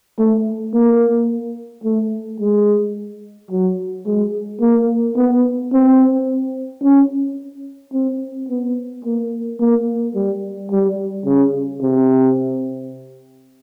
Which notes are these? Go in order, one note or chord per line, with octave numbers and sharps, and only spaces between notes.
A3
A#3
A3
G#3
F#3
G#3
A#3
B3
C4
C#4
C4
B3
A#3
A#3
G3
G3
C#3
C3